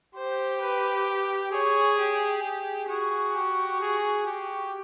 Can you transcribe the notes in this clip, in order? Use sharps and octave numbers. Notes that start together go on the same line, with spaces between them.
G4 C5
B4
G#4 C#5
G4
G#4
F#4 G#4
G4
G#4
G4